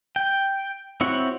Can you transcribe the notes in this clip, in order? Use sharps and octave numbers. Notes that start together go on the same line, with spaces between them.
G5
C4 E4 F#4 C#5 F#5